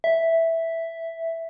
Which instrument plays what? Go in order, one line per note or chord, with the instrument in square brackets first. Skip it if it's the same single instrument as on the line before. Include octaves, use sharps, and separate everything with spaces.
[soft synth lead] E5